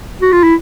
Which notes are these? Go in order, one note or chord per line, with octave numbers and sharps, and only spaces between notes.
F#4
F4
E4